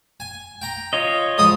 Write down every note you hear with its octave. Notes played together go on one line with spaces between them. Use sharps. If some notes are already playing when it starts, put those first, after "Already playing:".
G#5
G5 A#5
F4 C#5 D#5
C#2 F3 D#6